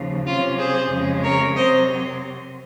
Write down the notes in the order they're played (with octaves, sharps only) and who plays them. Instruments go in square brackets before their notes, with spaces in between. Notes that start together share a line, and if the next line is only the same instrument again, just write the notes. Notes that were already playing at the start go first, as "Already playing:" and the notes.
Already playing: [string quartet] D#2 C#3 F3
C3 F#3 C#4 F4
G#4 C5
F2 C#3 G#3 C#4
A#4 C#5
C3 F#3 C4 C5 D#5